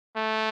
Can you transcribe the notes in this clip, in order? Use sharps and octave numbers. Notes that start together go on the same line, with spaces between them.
A3